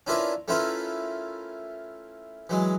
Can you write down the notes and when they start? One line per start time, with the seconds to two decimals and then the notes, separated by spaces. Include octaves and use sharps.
0.07 C#4 D4 E4 F4 A#4 B4
0.48 A3 C#4 E4 F4 A#4 B4
2.49 E3 F#3 G#3